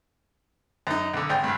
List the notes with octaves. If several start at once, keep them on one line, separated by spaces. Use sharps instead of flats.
F#2 D#4
B1 D3
G#1 G5
C#2 G2